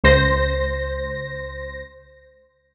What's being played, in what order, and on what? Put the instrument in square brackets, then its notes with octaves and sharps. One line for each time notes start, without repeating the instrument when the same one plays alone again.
[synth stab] C#2 C5 A#6